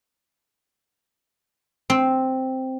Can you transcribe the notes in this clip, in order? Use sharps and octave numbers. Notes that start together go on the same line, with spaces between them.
C4